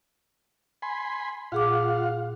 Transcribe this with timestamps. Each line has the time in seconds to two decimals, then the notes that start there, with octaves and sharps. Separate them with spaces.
0.82 G#5 B5 C6
1.52 A#2 F4 G#4 F5 F#5 D6